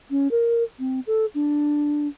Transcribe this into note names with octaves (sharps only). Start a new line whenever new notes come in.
C#4
A#4
C4
A4
D4